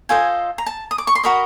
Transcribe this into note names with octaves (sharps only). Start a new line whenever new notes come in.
F4 A4 C5 D#5 G#5
A#5
A5
D#6
D6
C#6
C6
F#4 A#4 D#5 B5